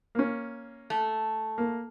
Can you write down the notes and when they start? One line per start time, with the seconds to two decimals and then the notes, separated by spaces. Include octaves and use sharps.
0.15 A#3 C#4
0.90 A3
1.58 A#3